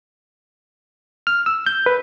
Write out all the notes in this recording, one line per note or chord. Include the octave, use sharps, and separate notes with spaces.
F6
E6
G6
B4